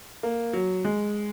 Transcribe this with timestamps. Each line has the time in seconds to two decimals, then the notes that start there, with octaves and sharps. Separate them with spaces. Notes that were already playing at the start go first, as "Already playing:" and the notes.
0.23 A#3
0.53 F#3
0.85 G#3